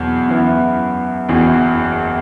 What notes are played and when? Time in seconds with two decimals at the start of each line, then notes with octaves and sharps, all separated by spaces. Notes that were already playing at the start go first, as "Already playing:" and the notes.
Already playing: E2 B2 F#3 B3
0.28 F#2 E3 B3 E4
1.29 F#1 E2 E3 B3 F#4